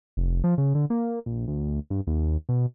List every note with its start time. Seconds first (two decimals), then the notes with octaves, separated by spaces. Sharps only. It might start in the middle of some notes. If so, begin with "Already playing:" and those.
0.17 F1
0.44 F3
0.58 C#3
0.75 D3
0.90 A#3
1.26 A#1
1.48 D2
1.90 G2
2.07 D#2
2.49 B2